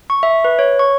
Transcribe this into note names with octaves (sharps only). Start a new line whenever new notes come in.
C#6
E5
B4
C#5
C#6